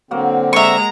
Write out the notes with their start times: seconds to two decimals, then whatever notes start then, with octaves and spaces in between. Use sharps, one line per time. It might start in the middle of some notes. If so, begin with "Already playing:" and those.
0.11 D3 F#3 A#3 C4
0.53 G#3 E5 A#5 C#6